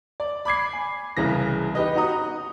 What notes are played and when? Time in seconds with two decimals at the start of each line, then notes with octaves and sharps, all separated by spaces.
0.20 D5
0.45 B5 D6 G#6 C7
0.73 G#5
1.17 C2 C#3 E3 A#6
1.75 D#4 G4 B4 D#5
1.95 D#4 F#4 A#5 D#6